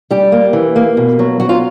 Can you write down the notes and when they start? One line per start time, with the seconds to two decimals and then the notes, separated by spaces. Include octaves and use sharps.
0.11 G3 G4
0.32 A#3
0.53 E3
0.76 A#3
0.97 B2
1.19 F#3
1.40 F#3 F#4
1.49 F4